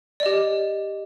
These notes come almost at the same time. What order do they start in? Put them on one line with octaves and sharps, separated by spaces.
D5 D#5 G4